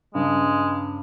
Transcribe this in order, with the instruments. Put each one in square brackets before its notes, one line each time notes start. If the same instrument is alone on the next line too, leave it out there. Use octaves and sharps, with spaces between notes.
[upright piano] G2 C#3 [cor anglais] G#3